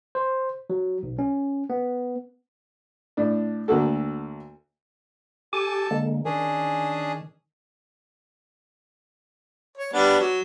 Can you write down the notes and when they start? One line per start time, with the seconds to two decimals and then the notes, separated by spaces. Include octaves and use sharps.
0.15 C5
0.70 F#3
1.03 B1
1.19 C#4
1.70 B3
3.17 A2 D4
3.68 D2 A#3 F#4 A4
5.53 G4 A4 G#5 A5 D6
5.91 D3 G#3 A#3
6.25 D#3 C#4 D4 G#4
9.77 C#5
9.93 G3 B3 D4
10.20 F#3